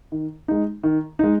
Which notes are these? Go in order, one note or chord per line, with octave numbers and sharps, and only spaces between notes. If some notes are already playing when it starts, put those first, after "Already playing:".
D#3
G#3 D#4
D#3
G#3 D#4